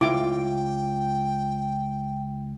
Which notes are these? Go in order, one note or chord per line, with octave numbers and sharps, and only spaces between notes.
C#2 E4 F4 G5 D6